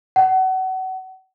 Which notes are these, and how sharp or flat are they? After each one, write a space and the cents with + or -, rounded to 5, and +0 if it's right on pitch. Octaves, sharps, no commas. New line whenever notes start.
F#5 +30